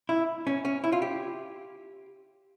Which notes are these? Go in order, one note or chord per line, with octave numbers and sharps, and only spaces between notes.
E4
C#4
C#4
E4
F4
G4